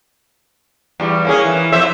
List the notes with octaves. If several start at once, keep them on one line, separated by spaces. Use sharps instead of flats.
E2 G3
A#3 C#4 G#4
E3
F2 C5 E5